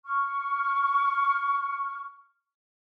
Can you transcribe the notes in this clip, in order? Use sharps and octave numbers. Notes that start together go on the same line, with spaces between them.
C#6 F6